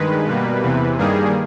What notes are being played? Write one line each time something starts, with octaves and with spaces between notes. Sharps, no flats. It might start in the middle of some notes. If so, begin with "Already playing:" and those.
Already playing: G2 D#3 G#3 B4
B2 G3 A#3
E2 C3 E3
G2 D#3 G3 A#3 G#4